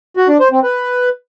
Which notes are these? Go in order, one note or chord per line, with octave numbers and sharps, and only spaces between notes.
F#4
D4
C5
C4
B4